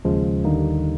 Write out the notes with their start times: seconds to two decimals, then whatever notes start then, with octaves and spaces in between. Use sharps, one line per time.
0.05 D#2 C#3 F3 G#3
0.44 D#2 D3 G3 A#3 D#4